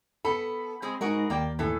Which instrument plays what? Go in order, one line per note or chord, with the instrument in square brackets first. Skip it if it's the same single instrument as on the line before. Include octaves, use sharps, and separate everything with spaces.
[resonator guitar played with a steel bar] B3 A4 [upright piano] B5
[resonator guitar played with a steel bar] G#3 C4 G#4
[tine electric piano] G#3 D#4 [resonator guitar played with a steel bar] F#4 G#4 A#4
[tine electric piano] D#2 [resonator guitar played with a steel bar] A#3 D5 G5
[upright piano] A2 [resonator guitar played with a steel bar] E3 A4